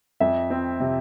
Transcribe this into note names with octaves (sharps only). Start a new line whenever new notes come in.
F2 E5
C4
C3